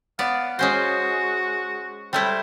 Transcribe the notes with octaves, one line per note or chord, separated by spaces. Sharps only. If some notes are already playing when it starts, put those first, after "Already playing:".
B3 D5 F5
G#3 C#4 F#4 C5
G3 A3 E4 C5